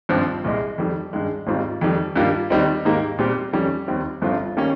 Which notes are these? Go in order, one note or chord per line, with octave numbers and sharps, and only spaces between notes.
G#1 G2 F3 C4
C2 A#2 G#3
F2 D#3 G3
G2 D#3 G#3
G#1 G#2 G3 C4 F4
F2 D#3 G3
G2 D#3 G3 A#3 F4
D#2 D#3 G3 C4 D#4
G#2 D#3 A#3 D#4 G4
A#2 G3 C4 G4
F2 D#3 G3 C#4
D#2 D#3 G3 C4
G1 G2 F3 C4 F4
D#3 G3 A#3 C#4